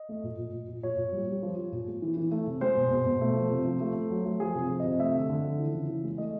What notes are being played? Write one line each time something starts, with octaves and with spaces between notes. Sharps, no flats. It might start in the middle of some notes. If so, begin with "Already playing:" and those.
Already playing: D#5
A3
A#2
A#2
A#2
A#2
A#2 C#5
A#2
G3
G3
F3
F3
A#2
G#3
E3
E3
A3
C3
G#3 C5
B2
B2
B2
A3
F3
C3
F3
A3
A3
F#3
A3
F3 G#4
C3
F3
C3 D#5
A3 E5
D3
D3
F3
E3
C#3
E3
G#3
A3 D#5